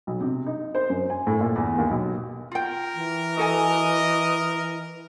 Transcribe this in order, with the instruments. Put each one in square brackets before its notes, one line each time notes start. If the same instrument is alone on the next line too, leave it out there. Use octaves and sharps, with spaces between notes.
[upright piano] B1
C3
D#4
C5
F#2
G#5
A2
A#2
E2
D#2
B1
[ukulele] F4 G5 [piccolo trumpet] A#4
[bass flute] E3
[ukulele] F#4 A4 G#5 [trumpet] D#5